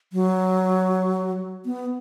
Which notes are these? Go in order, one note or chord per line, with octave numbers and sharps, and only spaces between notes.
F#3
B3